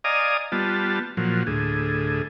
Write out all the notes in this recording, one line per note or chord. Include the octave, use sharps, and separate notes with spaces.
D5 D#5 F5 G#5 A#5 D#6
G3 B3 F4 A5
A#2 F3 F#3
D2 A2 G#4